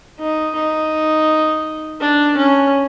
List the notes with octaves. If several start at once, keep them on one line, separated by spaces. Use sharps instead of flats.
D#4
D#4
D4
C#4